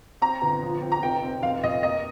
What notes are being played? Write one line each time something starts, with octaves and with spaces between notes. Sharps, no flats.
C4 A#5
G1
F3
C4
A#5
F1 G5
C4
F1 F5
F2 D#5
A#3 D#5